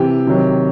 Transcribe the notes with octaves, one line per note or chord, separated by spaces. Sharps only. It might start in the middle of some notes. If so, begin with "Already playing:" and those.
Already playing: C3 E3 G4
C3 D#3 F#3